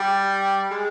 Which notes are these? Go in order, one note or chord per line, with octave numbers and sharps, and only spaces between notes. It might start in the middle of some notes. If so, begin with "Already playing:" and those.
Already playing: G3
G#3